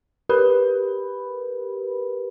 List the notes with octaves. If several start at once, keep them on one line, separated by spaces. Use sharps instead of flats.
G4 A#4 B4 B5